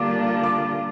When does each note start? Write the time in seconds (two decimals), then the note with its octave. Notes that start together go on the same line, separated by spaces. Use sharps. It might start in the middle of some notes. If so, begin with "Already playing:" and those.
Already playing: D3 G3 A#3 D4 F4 D6
0.43 D6